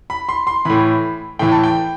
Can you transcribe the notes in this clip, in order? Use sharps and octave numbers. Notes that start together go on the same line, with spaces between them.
B5
C6
C6
A2 E3 B5
A2 E3 G5
A5
G5